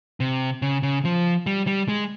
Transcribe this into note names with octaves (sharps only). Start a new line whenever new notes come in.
C3
C#3
C#3
F3
G3
G3
G#3